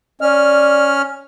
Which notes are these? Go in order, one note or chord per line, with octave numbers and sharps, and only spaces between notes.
C#4 D5 F6